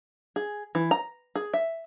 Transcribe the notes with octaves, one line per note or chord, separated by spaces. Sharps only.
G#4
E3
A#5
G#4
E5